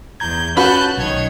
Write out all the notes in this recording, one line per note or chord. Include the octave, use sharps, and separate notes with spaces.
E2 A#5 G6 G#6
C#4 F#4 B4 A5 B5 F#6 G6
B1 D#3 C#5 G#6